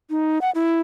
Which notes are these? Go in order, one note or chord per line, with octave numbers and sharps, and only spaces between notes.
D#4
F#5
E4